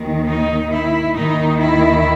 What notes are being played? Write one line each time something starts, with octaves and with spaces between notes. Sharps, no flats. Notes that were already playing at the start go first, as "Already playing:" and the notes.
Already playing: D#2 D#3
D#4
E4
D#2 D#3 D#4
E4